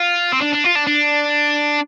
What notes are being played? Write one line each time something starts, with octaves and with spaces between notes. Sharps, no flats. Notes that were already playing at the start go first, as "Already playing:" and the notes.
Already playing: F4
C4
D4
D4
F4
D4
D4